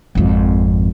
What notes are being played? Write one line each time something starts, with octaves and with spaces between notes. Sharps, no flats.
G#1 F2